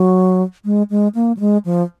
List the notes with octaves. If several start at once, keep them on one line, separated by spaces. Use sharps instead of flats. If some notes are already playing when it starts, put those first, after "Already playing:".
Already playing: F#3
G#3
G#3
A#3
F#3
G#3
F3